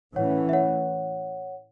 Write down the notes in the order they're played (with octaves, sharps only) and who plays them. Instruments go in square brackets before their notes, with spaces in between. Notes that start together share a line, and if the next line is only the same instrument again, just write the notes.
[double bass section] A2 E3 A3 C#4 [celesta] C#5 F#5
[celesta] E5
C#5 F#5